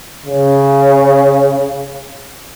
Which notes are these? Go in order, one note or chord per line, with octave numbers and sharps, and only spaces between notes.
C#3